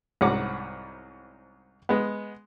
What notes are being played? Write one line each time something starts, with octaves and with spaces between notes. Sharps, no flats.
C2 G#2 C#4 F#4 F#5 D6
G#3 B3